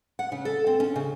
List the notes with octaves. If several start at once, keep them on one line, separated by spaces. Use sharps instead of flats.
F#5
C#3
A4
C4
C#4
C#3